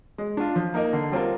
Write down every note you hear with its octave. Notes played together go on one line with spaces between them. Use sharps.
G#3
D4 F4
F3
A#3 D#4 A#4 D#5
D3
G3 C4 F4 A#4